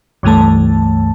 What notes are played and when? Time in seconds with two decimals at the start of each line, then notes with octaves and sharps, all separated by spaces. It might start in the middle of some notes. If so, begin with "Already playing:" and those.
0.23 C#2 G2 E3 A3 A5